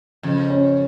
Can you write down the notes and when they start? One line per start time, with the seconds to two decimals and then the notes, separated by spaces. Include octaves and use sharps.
0.23 F2 C#3
0.50 C#4